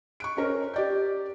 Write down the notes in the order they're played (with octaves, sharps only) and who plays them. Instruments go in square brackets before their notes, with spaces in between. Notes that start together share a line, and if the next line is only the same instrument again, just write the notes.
[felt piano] C#6 F#6 D7
C#4 A#4 C5
G4 D5 G6